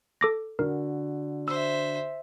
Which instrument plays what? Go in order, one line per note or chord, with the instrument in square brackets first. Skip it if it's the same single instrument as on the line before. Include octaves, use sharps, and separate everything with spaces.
[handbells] A4 D6 A#6
[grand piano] D3 F#4 [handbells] A#4
[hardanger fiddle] C5 E5 [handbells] E6